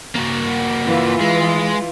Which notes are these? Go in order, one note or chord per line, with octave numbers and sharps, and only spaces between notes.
A#3 F#4
E3 F4
G#3